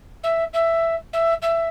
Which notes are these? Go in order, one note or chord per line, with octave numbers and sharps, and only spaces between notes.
E5
E5
E5
E5